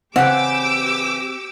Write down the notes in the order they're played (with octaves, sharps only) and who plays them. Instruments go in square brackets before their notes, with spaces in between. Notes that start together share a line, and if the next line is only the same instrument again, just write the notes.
[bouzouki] C#3 E3 [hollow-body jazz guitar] C4 [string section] G4 D6 E6 [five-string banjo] F#5